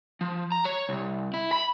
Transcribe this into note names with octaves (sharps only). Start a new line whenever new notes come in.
F3
A#5
C#5
C2
E4
B5